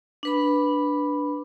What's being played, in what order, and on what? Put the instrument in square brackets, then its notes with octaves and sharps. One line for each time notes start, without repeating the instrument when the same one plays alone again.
[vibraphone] D4 B4 B5